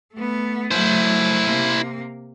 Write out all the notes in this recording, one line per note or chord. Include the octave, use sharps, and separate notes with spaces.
A3 B3
F#3 A3 E4 C5
C3 A#3